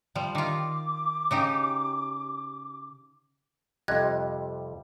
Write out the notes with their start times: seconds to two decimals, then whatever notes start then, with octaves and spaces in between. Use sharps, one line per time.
0.15 F3 G3
0.35 D#3 F4 D6
1.31 C#3 D#4 G4
3.88 F2 C3 G3 D#5 F#6 G#6